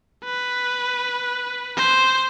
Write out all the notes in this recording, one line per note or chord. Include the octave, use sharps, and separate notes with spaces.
B4
C5